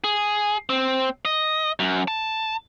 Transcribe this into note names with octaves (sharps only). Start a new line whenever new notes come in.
G#4
C4
D#5
F#2
A5